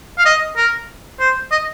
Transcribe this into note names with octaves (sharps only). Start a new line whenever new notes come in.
F5
D#5
A#4
C5
D#5